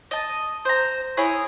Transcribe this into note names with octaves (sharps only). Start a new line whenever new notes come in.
D#5 A5
C5 A#5
E4 G#4 C#5 D#6